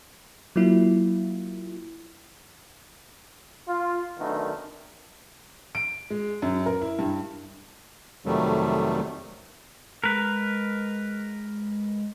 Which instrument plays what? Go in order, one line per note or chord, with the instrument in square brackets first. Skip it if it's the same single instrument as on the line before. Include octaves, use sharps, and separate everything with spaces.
[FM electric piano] F#3 A#3 E4 F4
[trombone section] F4
F#2 D3 D#3 A3 B3 D4
[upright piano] D7
G#3
F#2
A#4
E4
G2
[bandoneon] F2 C3 D#3 F#3 G3 A3
[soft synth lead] G#3 [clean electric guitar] A#4 B4